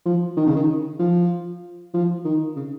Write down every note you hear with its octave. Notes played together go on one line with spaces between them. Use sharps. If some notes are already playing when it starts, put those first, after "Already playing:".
F3
D#3
C#3
D#3
F3
F3
D#3
C#3